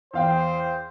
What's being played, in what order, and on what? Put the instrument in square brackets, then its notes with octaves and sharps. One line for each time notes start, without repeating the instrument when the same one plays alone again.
[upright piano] E2 F5 G5 [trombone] C5